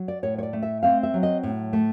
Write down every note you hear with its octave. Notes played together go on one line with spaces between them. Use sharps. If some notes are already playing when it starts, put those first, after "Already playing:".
Already playing: F#3
D5
A2 C#5
C#5
D5
A3
E5
C4 F5
E5
F#3
D#5
A2
A3